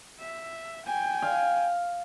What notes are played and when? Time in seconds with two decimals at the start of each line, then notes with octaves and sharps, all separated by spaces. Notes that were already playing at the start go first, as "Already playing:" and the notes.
0.19 E5
0.86 G5 G#5
1.22 F5